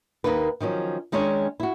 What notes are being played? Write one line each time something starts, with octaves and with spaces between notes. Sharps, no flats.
D#2 A#3 D#4 A#4 B4
D#3 F3 F#3 C#4
D#3 G#3 C#4 D4 C#5
E4 F#4